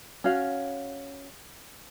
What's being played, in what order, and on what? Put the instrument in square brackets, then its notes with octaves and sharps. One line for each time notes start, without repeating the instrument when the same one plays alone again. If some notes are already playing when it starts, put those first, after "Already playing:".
[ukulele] C#4 F#4 F5